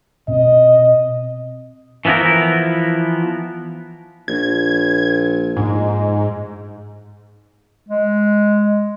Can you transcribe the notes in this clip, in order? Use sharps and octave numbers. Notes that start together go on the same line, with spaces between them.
B2 C4 D#5
E3 F3 B3 E4 A#4
A#1 G#6
G#2
G#3